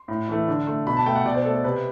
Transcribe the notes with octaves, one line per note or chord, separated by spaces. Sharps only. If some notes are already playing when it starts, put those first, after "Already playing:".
Already playing: C6
A2
E3 A3
D3
A3
B2 B5
A5
A3 G5
F#5
B2 D5
C5
A3 A4
A4
C3 B4